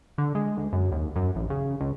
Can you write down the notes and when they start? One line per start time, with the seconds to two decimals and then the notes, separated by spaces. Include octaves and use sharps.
0.18 D3
0.35 G#3
0.58 D2
0.73 F#2
0.92 D#2
1.16 F#2
1.35 A1
1.50 C#3
1.81 C#2